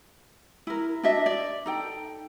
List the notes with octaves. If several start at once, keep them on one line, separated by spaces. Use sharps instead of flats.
E4 A#4
D4 F#4 D#5 E5
D5
D#4 A4 G5